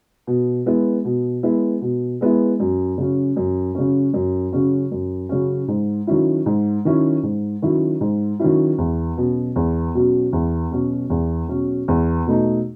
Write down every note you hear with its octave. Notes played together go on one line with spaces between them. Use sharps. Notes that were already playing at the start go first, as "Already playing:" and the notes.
B2
G#3 B3 E4
B2
G#3 B3 E4
B2
G#3 B3 E4
F#2
C#3 F#3 C#4
F#2
C#3 F#3 C#4
F#2
C#3 F#3 C#4
F#2
C#3 F#3 C#4
G#2
D#3 F#3 C#4 E4
G#2
D#3 F#3 C#4 E4
G#2
D#3 F#3 C#4 E4
G#2
D#3 F#3 C#4 E4
E2
B2 F#3 C#4
E2
B2 F#3 C#4
E2
B2 F#3 C#4
E2
B2 F#3 C#4
E2
B2 A3 D#4